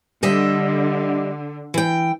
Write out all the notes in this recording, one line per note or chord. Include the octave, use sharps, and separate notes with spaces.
D3 G3 D#5 E5
E3 G5